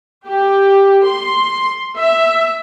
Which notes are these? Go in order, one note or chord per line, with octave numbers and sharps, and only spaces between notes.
G4
C6
E5